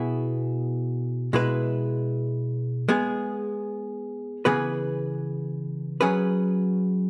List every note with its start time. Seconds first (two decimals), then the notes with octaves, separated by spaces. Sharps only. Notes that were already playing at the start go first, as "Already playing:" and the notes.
Already playing: B2 B3 E4 G#4
1.33 B2 G#3 E4 B4
2.89 G#3 B3 G#4
4.45 C#3 E3 B3 G#4 B4
6.01 F#3 C#4 G#4 B4